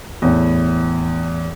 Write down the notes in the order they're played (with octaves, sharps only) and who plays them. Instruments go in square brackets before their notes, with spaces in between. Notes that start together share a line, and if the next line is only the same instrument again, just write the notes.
[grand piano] E2 A2